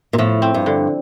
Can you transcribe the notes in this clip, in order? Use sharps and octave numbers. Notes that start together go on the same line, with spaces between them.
A#2
A2 F3
C4
G2
D3